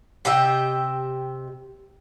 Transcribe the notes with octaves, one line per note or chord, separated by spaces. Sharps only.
C3 G4 D#5 E5